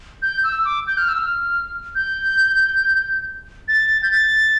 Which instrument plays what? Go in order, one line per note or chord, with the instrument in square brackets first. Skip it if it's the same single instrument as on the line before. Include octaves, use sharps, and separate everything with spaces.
[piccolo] G6
E6
D6
G6
F6
E6
F6
G6
A6
G6
A6